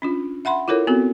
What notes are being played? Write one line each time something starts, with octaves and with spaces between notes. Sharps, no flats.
C#4 D4 F4
E5 F#5 B5 C6
E4 F4 A4 A#4 C#5
B3 C4 F#4 A4